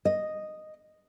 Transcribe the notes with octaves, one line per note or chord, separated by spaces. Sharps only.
D#5